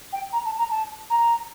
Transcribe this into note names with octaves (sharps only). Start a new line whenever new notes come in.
G5
A#5
A5
A#5
A5
A#5